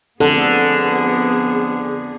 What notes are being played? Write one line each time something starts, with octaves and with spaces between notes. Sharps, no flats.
F2 D3 B3 G#4 A4